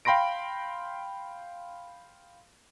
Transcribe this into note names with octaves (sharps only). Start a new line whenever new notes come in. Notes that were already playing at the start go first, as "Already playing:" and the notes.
F5 G5 B5 C6 A#6 D7